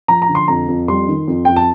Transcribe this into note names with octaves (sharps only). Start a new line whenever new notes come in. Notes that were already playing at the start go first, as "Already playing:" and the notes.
F3 A#5
A#5
D3
C6
F2 A#5
F2
G3 C6
D#3
F2
F2 G5
A5